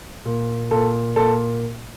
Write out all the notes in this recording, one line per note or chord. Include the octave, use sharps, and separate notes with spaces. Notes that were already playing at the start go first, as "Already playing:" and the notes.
A#2
A#2 A4
A#2 A4